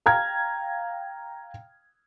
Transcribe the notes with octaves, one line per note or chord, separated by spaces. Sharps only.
F5 G5 A#5 F6 G#6